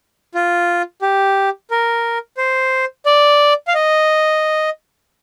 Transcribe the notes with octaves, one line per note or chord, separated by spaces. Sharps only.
F4
G4
A#4
C5
D5
F5
D#5